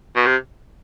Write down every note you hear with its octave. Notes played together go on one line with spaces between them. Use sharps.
B2
C3